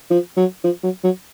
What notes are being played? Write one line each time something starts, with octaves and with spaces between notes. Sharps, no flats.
F3
F#3
F3
F#3
F#3